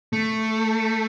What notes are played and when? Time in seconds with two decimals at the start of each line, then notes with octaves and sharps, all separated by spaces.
0.13 A3